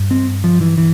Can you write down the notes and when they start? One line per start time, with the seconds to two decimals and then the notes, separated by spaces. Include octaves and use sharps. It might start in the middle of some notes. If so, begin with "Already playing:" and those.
Already playing: G2
0.11 C4
0.44 F3
0.61 E3
0.78 E3